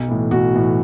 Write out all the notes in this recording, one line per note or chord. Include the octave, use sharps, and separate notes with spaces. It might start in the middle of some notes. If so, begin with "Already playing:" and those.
Already playing: B1
A2 E3
B1 F#4
A2 E3